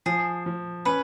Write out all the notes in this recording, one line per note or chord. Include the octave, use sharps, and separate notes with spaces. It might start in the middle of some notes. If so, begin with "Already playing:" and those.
F3 G#4
F3
C#4 B4